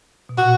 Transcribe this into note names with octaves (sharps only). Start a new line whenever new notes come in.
B2
A#2 F#4